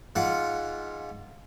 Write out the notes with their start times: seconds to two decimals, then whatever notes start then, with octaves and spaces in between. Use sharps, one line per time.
0.16 G#2 F4 F#5